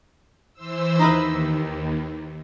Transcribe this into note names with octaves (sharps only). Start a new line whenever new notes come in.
E3 C5 E6
D#2 D#4 E4 B4